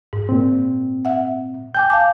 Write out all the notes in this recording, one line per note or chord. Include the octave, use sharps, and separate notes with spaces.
G#2
A#2 C4
E5 F#5
G5 G#5 D6 G6
F5 A5 D6